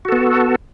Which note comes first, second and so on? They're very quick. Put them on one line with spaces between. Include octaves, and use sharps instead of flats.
F#4 A4 B3